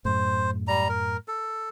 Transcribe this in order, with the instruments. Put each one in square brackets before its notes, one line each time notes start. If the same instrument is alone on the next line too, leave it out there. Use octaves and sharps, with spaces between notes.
[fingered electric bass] F#2 A2 [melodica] C5
[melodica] G3 A#5
A#4
A4